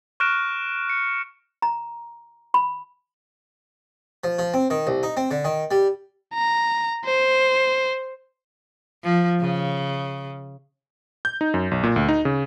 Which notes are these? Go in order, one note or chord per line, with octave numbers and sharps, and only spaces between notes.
C#6 F6 F#6 A#6 D7 E7
C#7
A#5
B5
F3
F3
C4
D#3
C2
D#4
C4
D3
D#3
G3
A#5
C5
F3
C#3
G6
D#4
F#2
B1
A#2
D2
D#4
C#3